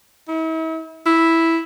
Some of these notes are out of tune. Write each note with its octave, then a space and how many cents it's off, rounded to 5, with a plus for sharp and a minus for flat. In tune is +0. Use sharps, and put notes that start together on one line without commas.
E4 -40
E4 -5